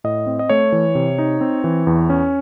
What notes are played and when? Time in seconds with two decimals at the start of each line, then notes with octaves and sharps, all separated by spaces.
0.04 A2 D#5
0.27 C4
0.39 D#5
0.49 A3 C#5
0.72 E3
0.95 C3
1.18 D#4
1.41 C4
1.64 E3
1.87 E2
2.10 C#4